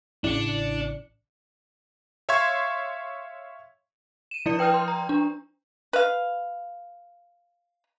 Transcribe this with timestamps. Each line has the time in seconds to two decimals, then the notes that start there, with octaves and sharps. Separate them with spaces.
0.24 A1 C#3 D4 E4 C#7
2.29 C#5 E5 F5 C6 C#6 G#6
4.31 D#7 E7
4.46 F3 E4 D5 C#7
4.59 B4 G5 D#6 F6 G6
4.74 C6
4.88 A#5
5.09 D4
5.93 B4 F5